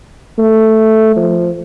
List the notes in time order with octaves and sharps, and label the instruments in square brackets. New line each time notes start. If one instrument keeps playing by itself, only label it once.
[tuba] A3
F3